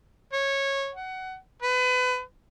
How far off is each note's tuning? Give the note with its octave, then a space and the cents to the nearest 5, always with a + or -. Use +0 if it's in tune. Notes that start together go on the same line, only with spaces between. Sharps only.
C#5 -15
F#5 +20
B4 +30